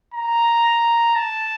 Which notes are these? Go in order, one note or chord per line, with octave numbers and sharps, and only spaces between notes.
A#5
A5